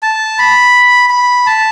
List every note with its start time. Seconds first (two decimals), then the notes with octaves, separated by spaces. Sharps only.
0.03 A5
0.39 B5
1.10 B5
1.46 A5